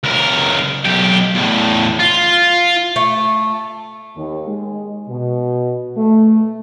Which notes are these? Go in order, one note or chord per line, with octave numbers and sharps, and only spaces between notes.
C#2 A#4
B1 G4
E2 A2
F4
A3
D#2
G#3
B2
A3